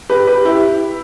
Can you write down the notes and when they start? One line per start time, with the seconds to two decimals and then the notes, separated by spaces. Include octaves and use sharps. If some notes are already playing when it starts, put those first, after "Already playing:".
0.10 G4 B4
0.27 G4 B4
0.45 E4 G4